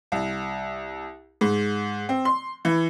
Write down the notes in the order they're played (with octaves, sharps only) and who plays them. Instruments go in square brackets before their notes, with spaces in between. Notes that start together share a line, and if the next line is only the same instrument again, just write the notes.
[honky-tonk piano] C2
G#2
C4
C6
E3